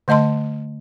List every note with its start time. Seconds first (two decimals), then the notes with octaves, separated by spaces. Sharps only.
0.08 D3 A3 D#5 A5 C6